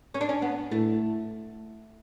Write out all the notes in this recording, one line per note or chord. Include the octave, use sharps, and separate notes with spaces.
C#4
D4
C#4
B3
A2 A3